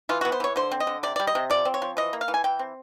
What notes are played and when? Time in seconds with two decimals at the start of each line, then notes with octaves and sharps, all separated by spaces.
0.09 E3 F4
0.21 F#4
0.25 B3
0.32 C5
0.40 E3 C#5
0.56 D3 C5
0.72 C4
0.80 D#5
0.87 D3
1.03 C3 D5
1.16 G3 D5
1.27 D#5
1.35 C3
1.50 F3 D5
1.65 C4
1.74 C#5
1.82 F3
1.97 E3 D#5
2.13 A#3
2.21 F5
2.28 E3
2.34 G#5
2.44 E3 G5
2.59 C4